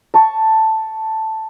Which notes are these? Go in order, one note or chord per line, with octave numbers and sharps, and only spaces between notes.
A5 C#6